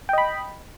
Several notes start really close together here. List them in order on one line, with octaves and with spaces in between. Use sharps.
G5 D#5 B5